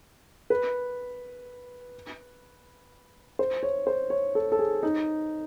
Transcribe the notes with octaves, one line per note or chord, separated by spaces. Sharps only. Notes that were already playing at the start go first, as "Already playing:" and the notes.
B4
C5
C#5
C5
C#5
A4
A4
G#4
D#4